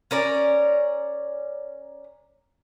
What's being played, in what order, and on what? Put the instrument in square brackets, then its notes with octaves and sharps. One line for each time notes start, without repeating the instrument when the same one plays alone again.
[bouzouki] C#4 A#4 D5